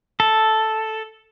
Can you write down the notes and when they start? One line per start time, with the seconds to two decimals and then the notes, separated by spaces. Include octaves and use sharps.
0.20 A4